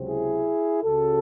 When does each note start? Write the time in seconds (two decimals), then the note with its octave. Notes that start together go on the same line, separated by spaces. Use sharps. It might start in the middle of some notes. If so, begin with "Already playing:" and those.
Already playing: C#2 C3 F#3 C4
0.08 E4 G#4
0.82 C#2 C#3 G#3 F#4 A4